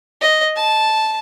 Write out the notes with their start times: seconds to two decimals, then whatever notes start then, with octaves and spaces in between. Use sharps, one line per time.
0.21 D#5
0.56 A5